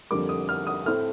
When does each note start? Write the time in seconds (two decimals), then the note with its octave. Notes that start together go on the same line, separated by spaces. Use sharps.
0.11 F2 D3 G3 A#3 D6
0.29 D#6
0.49 F6
0.67 D#6
0.86 A2 A3 C4 F6